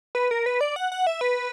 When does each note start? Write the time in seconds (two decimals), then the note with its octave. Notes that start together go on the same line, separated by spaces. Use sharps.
0.15 B4
0.31 A#4
0.46 B4
0.61 D5
0.76 F#5
0.92 F#5
1.07 E5
1.21 B4